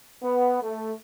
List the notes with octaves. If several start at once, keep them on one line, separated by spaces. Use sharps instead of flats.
B3
A3